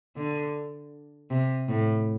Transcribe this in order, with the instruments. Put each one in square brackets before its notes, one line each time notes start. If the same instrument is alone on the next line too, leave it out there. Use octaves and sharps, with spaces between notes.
[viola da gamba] D3
C3
A2